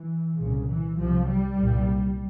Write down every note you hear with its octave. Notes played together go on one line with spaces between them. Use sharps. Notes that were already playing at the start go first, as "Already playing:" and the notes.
Already playing: E3
C2 A#2 C#3
E3
C2 C3 F3
G3
C2 A#2